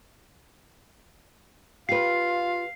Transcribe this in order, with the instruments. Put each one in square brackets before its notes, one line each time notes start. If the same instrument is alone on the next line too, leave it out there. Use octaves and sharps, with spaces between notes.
[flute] F4 [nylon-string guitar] G4 B4 [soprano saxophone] F5 [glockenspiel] C7